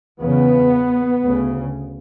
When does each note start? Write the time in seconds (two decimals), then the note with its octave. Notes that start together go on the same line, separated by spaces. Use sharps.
0.21 E2 C#3 B3
1.24 D2 C#3